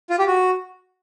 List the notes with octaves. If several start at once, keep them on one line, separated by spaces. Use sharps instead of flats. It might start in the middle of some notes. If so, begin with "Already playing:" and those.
F4
G4
F#4